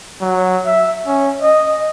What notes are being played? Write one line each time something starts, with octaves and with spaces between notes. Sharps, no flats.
F#3
E5
C#4
D#5